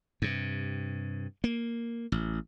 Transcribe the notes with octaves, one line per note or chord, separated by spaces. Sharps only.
G2 C3
A#3
A1